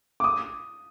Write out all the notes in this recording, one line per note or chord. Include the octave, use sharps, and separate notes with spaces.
D6
D#6